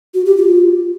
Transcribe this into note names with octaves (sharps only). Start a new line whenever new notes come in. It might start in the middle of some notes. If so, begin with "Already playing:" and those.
F#4
G4
F4